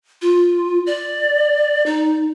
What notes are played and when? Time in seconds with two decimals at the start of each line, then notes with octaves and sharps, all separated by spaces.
0.22 F4
0.87 D5
1.86 D#4